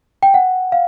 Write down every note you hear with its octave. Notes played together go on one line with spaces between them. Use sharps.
G5
F#5
F5